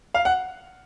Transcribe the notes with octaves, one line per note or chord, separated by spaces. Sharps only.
F5
F#5